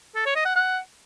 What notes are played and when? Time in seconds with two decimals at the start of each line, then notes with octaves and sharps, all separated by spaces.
0.16 A4
0.26 C#5
0.36 D#5
0.46 F#5
0.56 F#5